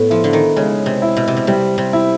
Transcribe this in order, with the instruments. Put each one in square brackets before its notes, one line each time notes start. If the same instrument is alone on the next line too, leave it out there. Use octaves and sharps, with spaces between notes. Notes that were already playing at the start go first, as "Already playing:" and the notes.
Already playing: [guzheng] A2 [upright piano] B3
[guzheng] F3 [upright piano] E4
[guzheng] D3
D#3
[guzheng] C#3 [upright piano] G#3
[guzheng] C3
[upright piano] E4
[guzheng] B2
C3
B2
[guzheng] C3 [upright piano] G3
[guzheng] C3
[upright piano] E4